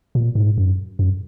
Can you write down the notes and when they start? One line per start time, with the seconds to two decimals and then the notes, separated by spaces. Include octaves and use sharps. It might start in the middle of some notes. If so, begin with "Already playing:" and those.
0.15 A#2
0.35 G#2
0.58 F#2
0.99 F#2